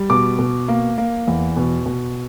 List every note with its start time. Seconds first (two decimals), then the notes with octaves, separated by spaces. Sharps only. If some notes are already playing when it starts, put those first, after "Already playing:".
Already playing: G3
0.10 B2 D6
0.39 B2
0.68 A#3
0.98 A#3
1.27 E2
1.56 B2
1.86 B2